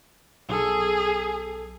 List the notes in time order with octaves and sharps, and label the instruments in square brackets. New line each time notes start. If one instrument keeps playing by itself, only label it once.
[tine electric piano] B1 A4 [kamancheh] G#4